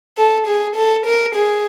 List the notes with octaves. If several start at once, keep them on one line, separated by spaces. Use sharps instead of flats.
A4
G#4
A4
A#4
G#4